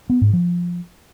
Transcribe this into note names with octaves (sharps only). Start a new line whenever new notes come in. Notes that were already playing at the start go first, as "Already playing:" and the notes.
B3
G#2
F3